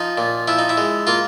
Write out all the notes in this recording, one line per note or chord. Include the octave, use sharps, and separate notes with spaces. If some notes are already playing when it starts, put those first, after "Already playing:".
Already playing: F3 D#4
A#2
F3 E4
D#4
E4
G#3
A#3 F4